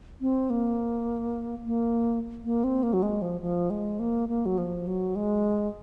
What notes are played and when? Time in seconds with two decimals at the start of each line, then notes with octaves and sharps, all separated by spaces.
0.21 C4
0.50 A#3
1.67 A#3
2.44 A#3
2.64 C4
2.83 A#3
2.93 F#3
3.03 G#3
3.22 F3
3.41 F3
3.70 G#3
3.99 A#3
4.29 A#3
4.46 F#3
4.58 F3
4.87 F#3
5.16 G#3